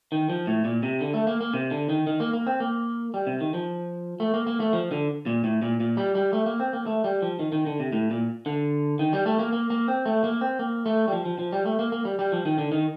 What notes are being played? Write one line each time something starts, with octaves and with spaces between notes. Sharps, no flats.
D#3
F3
A2
A#2
C3
D3
A3
A#3
A#3
C3
D3
D#3
D#3
A#3
A#3
C4
A#3
G3
C3
D#3
F3
A3
A#3
A#3
A3
F3
D3
A#2
A2
A#2
A#2
G3
G3
A3
A#3
C4
A#3
A3
G3
F3
D#3
D#3
D3
C3
A2
A#2
D3
D#3
G3
A3
A#3
A#3
A#3
C4
A3
A#3
C4
A#3
A3
G3
F3
F3
F3
G3
A3
A#3
A#3
G3
G3
F3
D#3
D3
D#3